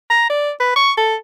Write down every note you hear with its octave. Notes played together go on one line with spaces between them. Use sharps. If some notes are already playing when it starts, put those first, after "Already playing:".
A#5
D5
B4
C#6
A4